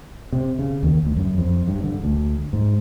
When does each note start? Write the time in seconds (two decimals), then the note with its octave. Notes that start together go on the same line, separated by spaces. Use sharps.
0.32 C3
0.59 C#3
0.83 D#2
1.05 D2
1.17 F#2
1.38 F2
1.68 G2
1.84 D3
2.03 D2
2.53 G#2